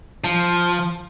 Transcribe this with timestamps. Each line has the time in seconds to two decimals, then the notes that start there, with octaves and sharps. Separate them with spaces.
0.24 F3